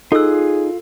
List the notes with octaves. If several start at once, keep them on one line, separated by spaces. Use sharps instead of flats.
D#4 F4 G#4 A4 E6 F#6